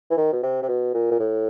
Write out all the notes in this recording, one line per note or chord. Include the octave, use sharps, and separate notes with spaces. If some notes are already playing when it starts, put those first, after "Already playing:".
E3
D#3
B2
C3
C3
B2
A#2
A#2
A2